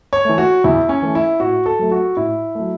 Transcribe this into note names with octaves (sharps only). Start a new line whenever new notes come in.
C#5
E3 A3
F#4
E2 E4
C#4
E3 A3
E4
A2 F#4
A4
F#3 A3
F#4
A2 E4
F#3 A3